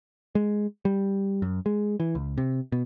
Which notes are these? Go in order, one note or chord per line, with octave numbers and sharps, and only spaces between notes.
G#3
G3
F#2
G#3
E3
C#2
C3
B2